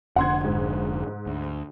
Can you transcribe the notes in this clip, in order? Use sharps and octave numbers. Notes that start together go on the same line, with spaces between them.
F1 D3 F#5 C6 G#6
G#2
D2